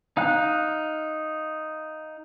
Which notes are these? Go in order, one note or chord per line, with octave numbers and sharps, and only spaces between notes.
D#4 F5 F#6